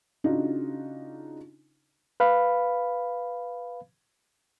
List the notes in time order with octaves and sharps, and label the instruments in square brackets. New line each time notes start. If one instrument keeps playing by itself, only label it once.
[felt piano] C#3 D4 D#4 F4 F#4
[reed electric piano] B4 F5 B5